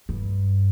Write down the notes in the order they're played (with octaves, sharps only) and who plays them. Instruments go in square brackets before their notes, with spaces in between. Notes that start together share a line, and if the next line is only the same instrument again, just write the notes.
[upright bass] G2